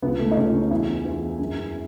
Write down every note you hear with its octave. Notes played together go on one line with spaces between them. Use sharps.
C#2 B3
A3
D#4
C#2 C#4
C#4
E2 E4
E2
F#2